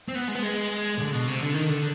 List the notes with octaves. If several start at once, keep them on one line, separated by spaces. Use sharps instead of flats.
C4
B3
G#3
B3
G#3
D3
B2
C3
D3
D#3
D3